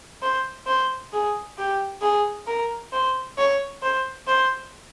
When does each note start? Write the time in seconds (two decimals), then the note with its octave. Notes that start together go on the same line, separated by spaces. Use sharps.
0.22 C5
0.67 C5
1.13 G#4
1.58 G4
2.02 G#4
2.47 A#4
2.92 C5
3.38 C#5
3.82 C5
4.27 C5